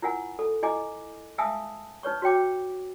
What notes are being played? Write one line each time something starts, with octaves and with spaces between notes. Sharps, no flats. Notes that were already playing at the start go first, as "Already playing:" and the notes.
E4 F4 A#4 F#5 G#5
A4
E4 D#5 G#5 D6
E5 F5 G#5 A5 D#6 E6
D#4 B4 C#5 C#6
F#4 C#5 G5 D6